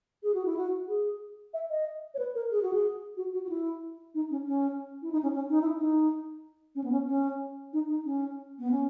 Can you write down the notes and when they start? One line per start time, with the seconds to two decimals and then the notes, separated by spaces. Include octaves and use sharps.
0.23 G#4
0.34 F#4
0.45 E4
0.57 F#4
0.88 G#4
1.54 E5
1.70 D#5
2.14 C#5
2.19 B4
2.35 A#4
2.51 G#4
2.62 F#4
2.73 G#4
3.17 F#4
3.33 F#4
3.44 F#4
3.49 E4
4.15 D#4
4.31 C#4
4.47 C#4
5.02 E4
5.12 D#4
5.23 C#4
5.34 C#4
5.50 D#4
5.62 E4
5.78 D#4
6.75 C#4
6.84 B3
6.92 C#4
7.08 C#4
7.73 D#4
7.89 D#4
8.05 C#4
8.59 B3
8.71 C#4